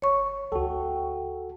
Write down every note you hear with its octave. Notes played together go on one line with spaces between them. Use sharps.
G1 C#5 C#6
D2 F#4 A4 G5